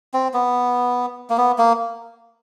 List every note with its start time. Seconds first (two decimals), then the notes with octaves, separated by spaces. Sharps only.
0.14 C4
0.34 B3
1.30 A#3
1.37 B3
1.58 A#3